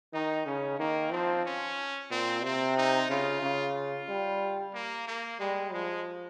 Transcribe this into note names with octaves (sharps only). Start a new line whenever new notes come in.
D#3 D#4
C#3 C#4
D#3 A#3
F3 C4
C#4
A#2 C4
C3 C4
D#4
C#3 F4
C#3
F4
G3
A#3
A#3
G3 G#3
F3 G#3